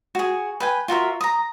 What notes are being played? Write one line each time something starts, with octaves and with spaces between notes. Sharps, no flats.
F#4 G#4
B4 G5 G#5
F4 F#4 A#4 E5
A#5 D#6